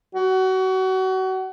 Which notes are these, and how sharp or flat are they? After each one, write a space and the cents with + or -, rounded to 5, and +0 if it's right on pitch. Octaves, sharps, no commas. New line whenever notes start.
F#4 +30